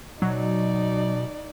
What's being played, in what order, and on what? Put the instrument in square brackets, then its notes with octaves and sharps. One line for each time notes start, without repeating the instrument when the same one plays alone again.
[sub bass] B2 [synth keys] F#3 [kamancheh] D#4 D5